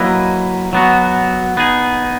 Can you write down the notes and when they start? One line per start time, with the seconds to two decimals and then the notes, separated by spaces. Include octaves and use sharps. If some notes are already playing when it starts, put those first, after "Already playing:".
Already playing: F#3 A#3 E4 B4 D#5
0.73 F#3 B3 F#4
1.57 B3 D#4 G#4